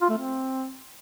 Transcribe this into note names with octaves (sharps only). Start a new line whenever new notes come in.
F4
A3
C4